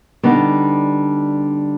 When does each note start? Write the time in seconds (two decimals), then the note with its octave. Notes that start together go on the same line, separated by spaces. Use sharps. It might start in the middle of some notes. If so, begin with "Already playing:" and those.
0.23 D3 G3 B3 D#4